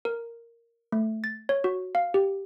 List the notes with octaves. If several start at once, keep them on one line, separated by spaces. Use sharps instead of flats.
A#4
A3
A6
C#5
F#4
F5
G4